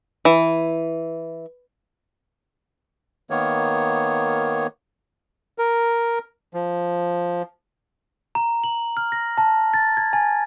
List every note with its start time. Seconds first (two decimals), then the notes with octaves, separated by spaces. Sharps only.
0.25 E3
3.30 D#3 A#3 B3 C#5
5.58 A#4
6.54 F3
8.35 A#5
8.64 F#7
8.97 F6
9.12 A#6
9.38 A5
9.74 A6
9.97 G#6
10.13 G#5